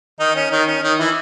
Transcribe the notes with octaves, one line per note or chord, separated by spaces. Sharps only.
D#3 D#4
C#4
D#3 D#4
C#4
D#3 D#4
E3 E4